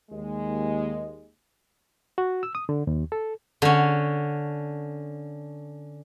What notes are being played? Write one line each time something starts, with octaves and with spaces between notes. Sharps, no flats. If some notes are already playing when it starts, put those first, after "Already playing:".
D#2 G#3
F#4
E6
D#6
D3
D#2
A4
D3 C#4